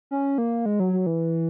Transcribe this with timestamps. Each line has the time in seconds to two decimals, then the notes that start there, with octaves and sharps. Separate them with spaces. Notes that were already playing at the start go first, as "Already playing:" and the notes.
0.11 C#4
0.38 A#3
0.66 G#3
0.80 F#3
0.93 F#3
1.07 E3